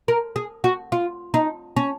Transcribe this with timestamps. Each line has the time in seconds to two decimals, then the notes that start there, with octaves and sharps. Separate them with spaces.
0.08 A#4
0.36 G#4
0.64 F#4
0.92 F4
1.34 D#4
1.77 C#4